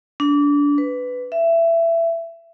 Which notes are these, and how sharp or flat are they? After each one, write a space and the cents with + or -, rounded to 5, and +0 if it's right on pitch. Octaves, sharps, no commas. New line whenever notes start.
D4 -25
B4 +10
E5 +20